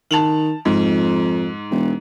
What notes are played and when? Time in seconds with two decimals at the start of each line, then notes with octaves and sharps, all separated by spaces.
0.11 D#3 A5 F7 F#7
0.65 F2 G#2
1.70 E1